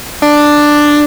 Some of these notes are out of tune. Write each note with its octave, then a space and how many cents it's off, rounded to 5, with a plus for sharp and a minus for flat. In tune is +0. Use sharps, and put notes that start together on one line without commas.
D4 +5